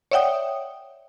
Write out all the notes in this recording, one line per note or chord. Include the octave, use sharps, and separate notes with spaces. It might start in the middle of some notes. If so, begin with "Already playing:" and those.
C#5 D5 E5 F#5 G5 D#6